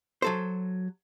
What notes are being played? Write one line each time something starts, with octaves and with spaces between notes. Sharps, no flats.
F#3 A4 C5